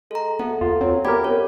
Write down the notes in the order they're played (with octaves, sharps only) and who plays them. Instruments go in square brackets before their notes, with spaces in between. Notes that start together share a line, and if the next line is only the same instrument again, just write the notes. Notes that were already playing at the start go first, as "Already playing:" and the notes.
[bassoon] G#3 [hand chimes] A4 A#5
[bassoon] D2 [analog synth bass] B3 [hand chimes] A4
[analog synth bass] E2 [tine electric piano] F4
[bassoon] F#3 [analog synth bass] C4
[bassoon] D2 [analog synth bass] B3 [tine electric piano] G4 A#4 [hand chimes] D5 B5 G#6
[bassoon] F#2 [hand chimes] C#5